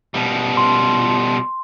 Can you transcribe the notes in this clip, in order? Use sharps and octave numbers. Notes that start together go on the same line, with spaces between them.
B2 G3
C6